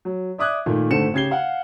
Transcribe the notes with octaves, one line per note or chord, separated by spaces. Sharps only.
F#3
D5 E5 D6 D#6 F#6 G#6
A#2 D#3 A3 A#3
G#1 D3 A3 C#7 E7
C#3 G4 G#6 C7 G7
F5 F#5